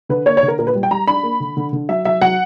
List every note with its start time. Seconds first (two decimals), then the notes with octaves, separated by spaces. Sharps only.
0.09 D3 B4
0.26 A#3 C#5
0.37 C#5
0.43 D3
0.48 A#4
0.59 A#2 A#4
0.67 B4
0.75 G3
0.83 G5
0.91 G3 A#5
1.07 D4 B5
1.23 A#3
1.40 D3
1.57 D3
1.73 D3
1.89 F#3 E5
2.05 F#3 E5
2.21 F#3 F#5